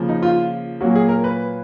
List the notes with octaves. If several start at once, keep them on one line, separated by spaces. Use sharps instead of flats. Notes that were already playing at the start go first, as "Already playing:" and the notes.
Already playing: C#3 F3 A#3
D#4
F4
A#2 F#3 A#3 F#4
G#4
A#4
B4